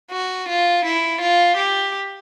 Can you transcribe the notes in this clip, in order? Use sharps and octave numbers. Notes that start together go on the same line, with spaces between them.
F#4
F4
E4
F4
G4